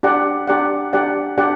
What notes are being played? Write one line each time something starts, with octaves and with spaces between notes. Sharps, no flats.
D4 G4 D5 F#5
D4 G4 D5 F#5
D4 G4 D5 F#5
D4 G4 D5 F#5